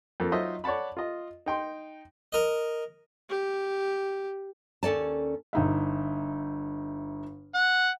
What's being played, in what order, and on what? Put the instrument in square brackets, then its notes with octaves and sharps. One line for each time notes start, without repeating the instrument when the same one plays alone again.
[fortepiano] F2 A#3 A4
F#3 D#4 F4 C5 D#5 E5
C#5 D5 F#5 A5 B5
F4 D#5
D#4 G5 C6
[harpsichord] A#4 D#5
[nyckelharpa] G4
[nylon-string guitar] D#2 C#4 A4 D5 A5
[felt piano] G1 D#4 E5
[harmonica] F#5